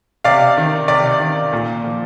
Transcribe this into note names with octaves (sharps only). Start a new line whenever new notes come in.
C3 D5 F5
D#3
C3 D5
D#3
A#2
F3